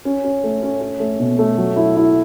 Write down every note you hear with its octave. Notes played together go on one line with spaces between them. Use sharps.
C#4
C#4
A3
C#4
C#4
A3
B2
A3
F#3
E4
E4